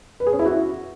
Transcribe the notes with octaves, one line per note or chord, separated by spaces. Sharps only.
B4
G#4
C#4
E4
F#4